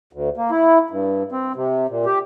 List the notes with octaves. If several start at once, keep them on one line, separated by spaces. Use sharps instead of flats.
D2
A#3
E4
G2
C4
C3
A#2
G4